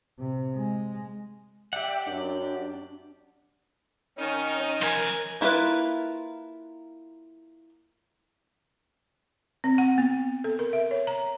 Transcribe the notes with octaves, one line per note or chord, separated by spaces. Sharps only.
C3
G#3
G4 D5 E5 F#5 G5
F#2 D4
D#3 C#4 D#4
F3 A#4 G#5
A#3 E4 F4 A#4 B4
C4
F#5
B3
A4
A#4
E5
C#5
A#5